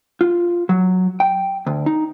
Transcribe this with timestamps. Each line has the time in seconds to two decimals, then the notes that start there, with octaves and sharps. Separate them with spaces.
0.21 F4
0.69 F#3
1.20 G5
1.67 D2
1.86 D#4